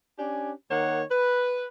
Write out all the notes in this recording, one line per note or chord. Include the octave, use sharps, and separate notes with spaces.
C#4 D4 G4 G#5
D#3 A#3 C#5 F#5
B4